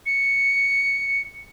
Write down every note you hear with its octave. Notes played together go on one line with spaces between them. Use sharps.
C#7